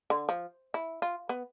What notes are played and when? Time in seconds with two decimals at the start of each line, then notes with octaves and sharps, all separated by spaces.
0.10 D3
0.29 F3
0.74 E4
1.02 F4
1.29 B3